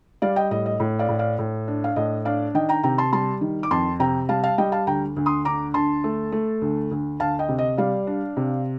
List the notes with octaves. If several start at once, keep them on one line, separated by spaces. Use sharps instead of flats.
G3 D5 F5
D#5 G5
A2 D#5
D#5
A2
D5 F5
A2
D5 F5
A2
D4
F5
A2 D#5
D4 D5 F5
D#3 D#5 G5
G5 A#5
C3 G5 A#5
A5 C6
G3 A5 C6
D#3
D6
F2 A5 C6
C3 G5 A#5
G3 F5 A5
F5 A5
G3 D#5 G5
F5 A5
D2 G5 A#5
D2
C6 D#6
D3 A#5 D6
D2 A5 C6
A3
A3
D2
D2
D2 F5 A5
D#5 G5
C3
D#5
G3 D5 F5
D4
C3